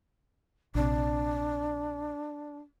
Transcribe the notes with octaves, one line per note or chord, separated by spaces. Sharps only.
A#1 C3 D4